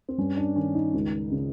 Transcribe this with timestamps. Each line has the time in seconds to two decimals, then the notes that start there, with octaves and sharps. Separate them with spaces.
0.09 C4
0.18 G2 C#4
0.37 D4
0.56 D#3 C#4
0.75 D#4
0.94 C#2
1.32 C#3